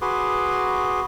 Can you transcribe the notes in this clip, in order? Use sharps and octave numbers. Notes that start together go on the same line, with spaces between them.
F#4 G#4 B4 C6 D6